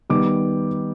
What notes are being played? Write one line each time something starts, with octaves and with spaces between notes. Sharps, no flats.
D#3 G3 B3 D6